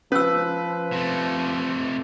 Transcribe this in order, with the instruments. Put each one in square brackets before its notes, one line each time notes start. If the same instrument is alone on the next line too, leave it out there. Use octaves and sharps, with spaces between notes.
[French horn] F3 [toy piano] C#4 E6 [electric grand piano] B4
[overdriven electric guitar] C3 A3